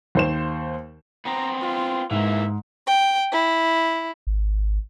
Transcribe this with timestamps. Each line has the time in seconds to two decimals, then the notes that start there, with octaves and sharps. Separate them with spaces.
0.15 D#2 C5 E7
1.25 B3 C4 A#5
1.62 F4
2.11 G#2 E3 A#3 E5
2.87 G5
3.32 E4
4.27 G#1